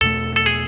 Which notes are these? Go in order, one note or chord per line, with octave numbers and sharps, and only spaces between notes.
E2 B2 A3 A4
A4
G#4